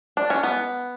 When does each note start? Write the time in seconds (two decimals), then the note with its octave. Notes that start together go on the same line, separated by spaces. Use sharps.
0.17 D4
0.30 C#4
0.43 B3